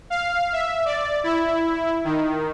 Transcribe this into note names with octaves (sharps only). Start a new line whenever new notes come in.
F5
E5
D5
E4
D#3